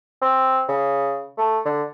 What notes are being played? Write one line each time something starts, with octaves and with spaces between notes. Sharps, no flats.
C4
C#3
A3
D3